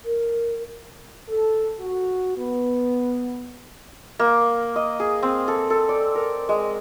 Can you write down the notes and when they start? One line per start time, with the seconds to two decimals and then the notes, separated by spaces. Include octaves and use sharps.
0.05 A#4
1.29 A4
1.79 F#4
2.36 B3
4.19 A#3
4.76 D#5
5.00 G#4
5.23 C4
5.48 A4
5.70 A4
5.89 D5
6.15 A#4
6.49 G#3